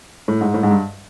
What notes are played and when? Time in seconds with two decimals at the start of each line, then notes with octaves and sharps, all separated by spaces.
0.28 A2
0.41 G#2
0.54 A2
0.63 G#2
0.71 G2